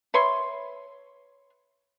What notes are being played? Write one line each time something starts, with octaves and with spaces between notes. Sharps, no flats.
B4 C#5 E5 C6